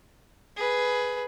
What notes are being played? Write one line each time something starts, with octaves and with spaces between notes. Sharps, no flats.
G#4 B4